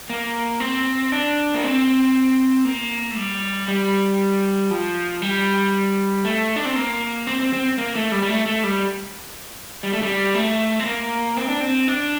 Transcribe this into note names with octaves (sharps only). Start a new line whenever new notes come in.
A#3
C4
D4
A#3
C4
A#3
A3
G3
G3
F3
G3
A3
D4
C4
A#3
C4
C4
C4
A#3
A3
G3
G3
A3
A3
G3
G3
A3
G3
A3
C4
A#3
C4
D4
C4
D4